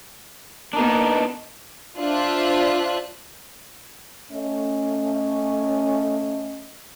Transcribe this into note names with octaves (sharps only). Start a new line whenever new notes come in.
A#3 B3 D4 D#4
D4 F4 C5 E5 F#6
A3 C#4 D#5